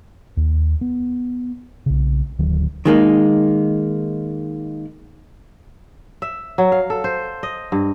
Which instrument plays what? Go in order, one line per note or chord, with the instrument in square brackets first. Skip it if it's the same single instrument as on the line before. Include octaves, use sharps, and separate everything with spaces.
[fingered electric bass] D#2
B3
B1 C#3
D1 D2 D#3 F#3
[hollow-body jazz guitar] D#3 G#3 A#3 D#4
[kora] E5
F#3
F5
A4
C5
D#5
G2